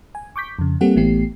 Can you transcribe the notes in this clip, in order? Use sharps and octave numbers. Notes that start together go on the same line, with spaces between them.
G#5
C#6 D6 G6 B6
F2 C#3
G3 A#3 C4 G4 A4 F#5
A1 E3 A3 B3 G4 C7